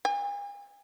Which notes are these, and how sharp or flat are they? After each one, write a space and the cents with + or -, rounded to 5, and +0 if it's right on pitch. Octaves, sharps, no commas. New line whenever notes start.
G#5 -40